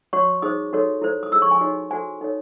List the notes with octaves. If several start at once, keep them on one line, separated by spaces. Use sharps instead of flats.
F#4 C#5 C#6
D#4 G#4 C5 D#6
D#4 F#4 A4 C#5
E4 A4 C5
D#6
E4 G#4 C#5 E6
C#6
G#5
D#4 F#4 C#5
F#4 A4 C5 G#5
D#4 A4 C#5